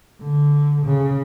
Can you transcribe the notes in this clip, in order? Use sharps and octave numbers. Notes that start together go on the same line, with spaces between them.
D3
C#3